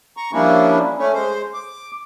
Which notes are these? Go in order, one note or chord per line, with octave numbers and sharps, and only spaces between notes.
A#5 C#6
F3 G3 A#3 C#4 D4 E4
A3 C#4
G#3 C5
D6